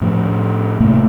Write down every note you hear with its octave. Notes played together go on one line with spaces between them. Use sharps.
A2 F3
A2 C3 A3 A#3